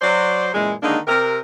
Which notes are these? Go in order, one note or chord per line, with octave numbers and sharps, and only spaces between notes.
F#3 C5 D5
F#2 A#2 E3 G#3
D3 D#3 G#3 A#3 D4 D#4
C3 A#4